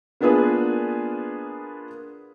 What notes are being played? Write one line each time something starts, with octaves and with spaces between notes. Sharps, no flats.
A#3 B3 D4 F4 G#4 B4